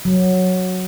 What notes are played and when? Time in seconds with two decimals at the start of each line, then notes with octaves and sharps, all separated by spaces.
0.05 F#3